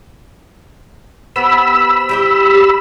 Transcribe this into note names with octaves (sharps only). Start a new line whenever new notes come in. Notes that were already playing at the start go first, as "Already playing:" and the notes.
B3 G4 C5 B5 E6
G3 E4 G4